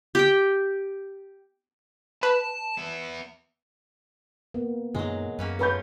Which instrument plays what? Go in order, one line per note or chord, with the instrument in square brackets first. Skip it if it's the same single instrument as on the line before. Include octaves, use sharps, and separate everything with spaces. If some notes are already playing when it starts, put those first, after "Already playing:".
[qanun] G4 G5
[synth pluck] B4 [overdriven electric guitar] A5
[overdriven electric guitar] B3 E4
[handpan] A#3 B3
[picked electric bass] F#2 A#2 D#3 [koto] F#3 G#3
[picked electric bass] F#2 [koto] A#3 C#4 B4
[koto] F#3 C#4 F4 [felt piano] B4 B5 G6